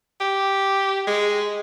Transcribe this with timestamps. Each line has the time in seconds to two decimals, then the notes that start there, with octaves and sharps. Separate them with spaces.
0.21 G4
1.07 G#3